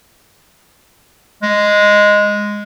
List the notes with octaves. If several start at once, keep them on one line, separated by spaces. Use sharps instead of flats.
G#3